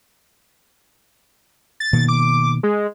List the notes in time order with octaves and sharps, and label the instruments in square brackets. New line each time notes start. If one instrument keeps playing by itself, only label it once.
[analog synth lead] A6
[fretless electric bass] B2 D#3 A#3
[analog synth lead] D6
G#3